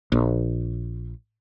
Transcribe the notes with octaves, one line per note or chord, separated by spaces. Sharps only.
A#1